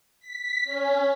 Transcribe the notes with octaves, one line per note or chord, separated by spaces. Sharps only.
B6
C#4